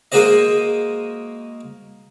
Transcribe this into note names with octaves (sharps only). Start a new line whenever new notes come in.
G#3 A#3 F#4 G#4 C5 D#5